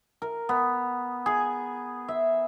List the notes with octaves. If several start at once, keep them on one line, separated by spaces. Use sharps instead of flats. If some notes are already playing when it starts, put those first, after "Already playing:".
A#4
B3
G#4
E5